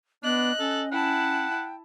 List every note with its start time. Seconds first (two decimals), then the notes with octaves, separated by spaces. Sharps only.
0.24 B3 D4 D#5 F#6
0.60 C#4 A4
0.92 E4 F#5 G5 A5